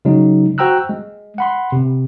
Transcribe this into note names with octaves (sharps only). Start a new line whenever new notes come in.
C#3 F#3 G#3 D#4
F#4 C5 G5 A#5 E6 F#6
G#3
F#5 B5 C6
C3